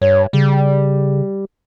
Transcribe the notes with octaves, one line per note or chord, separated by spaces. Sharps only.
G2 C#5
C#3 G3